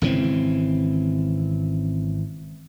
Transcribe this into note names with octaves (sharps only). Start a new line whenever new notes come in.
G#1 C#3 E3 C4